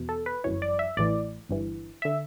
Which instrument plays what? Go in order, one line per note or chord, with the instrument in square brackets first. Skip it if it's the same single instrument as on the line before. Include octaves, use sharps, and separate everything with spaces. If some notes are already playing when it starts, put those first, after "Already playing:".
Already playing: [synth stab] E2 B2
A4
B4
G1 F#2 E3 C#5
D5
E5
A1 A2 E3 D5
G1 G2 E3
D3 E5